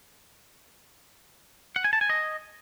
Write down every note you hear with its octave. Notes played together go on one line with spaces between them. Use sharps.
F#5
G#5
A5
G#5
D#5